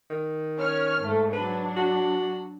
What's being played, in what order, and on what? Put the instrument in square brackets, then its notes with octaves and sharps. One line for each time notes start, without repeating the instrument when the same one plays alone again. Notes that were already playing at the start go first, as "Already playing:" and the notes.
[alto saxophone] D#3
[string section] C#4 C#5 F6
G#2 A3
[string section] F#3 D4 [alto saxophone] B4
[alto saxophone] F#4